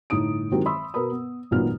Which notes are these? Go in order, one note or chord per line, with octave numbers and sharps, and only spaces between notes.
G1 A2 D#4 D#6 D7
D#3 E3 F#3 G#3 C4 G4
E5 B5 C6 D#6 E6
B2 A#4 B4 B5 D#6
B3
G#1 F#2 A#2 B3 D#4 F6